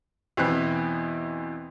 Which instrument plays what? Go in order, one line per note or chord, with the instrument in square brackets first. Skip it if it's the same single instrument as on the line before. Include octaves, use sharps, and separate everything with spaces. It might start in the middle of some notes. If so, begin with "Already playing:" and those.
[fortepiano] E2 B2 E3 B3 C4 F#6